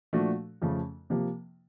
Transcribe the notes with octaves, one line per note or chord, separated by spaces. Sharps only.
A#2 F3 A3 D4 F#4
F2 C#3 F3 A3
C3 F3 A#3